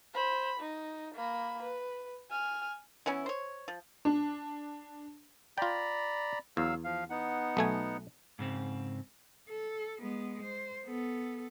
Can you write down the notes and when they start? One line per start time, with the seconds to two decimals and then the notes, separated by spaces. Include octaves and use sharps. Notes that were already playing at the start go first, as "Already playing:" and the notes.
0.13 C5 B5
0.60 D#4
1.15 A#3 B5
1.63 B4
2.31 G#5 F6
3.06 E3 B3 C#4 E4
3.26 C5 C#5
3.68 F3
4.05 D4
5.58 F4 D5 G5 A#5 B5
6.57 E2 F#3 F5 E6
6.84 F3 F5
7.10 B3 D#4 F#5
7.57 B1 A3 G#5
8.39 G#2 C#3 C4
9.49 A4
9.99 G#3 B3
10.43 C5
10.84 B3 A4